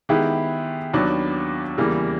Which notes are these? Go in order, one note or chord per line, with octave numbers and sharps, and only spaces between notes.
D#3 G#3 B3 E4 G4
D#2 D#3 F#3 B3 D4
E2 C#3 E3 G3 A#3